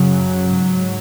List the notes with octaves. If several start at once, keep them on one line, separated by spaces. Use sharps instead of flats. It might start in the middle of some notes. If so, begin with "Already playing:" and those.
Already playing: F#2 C#3 F#3
G#2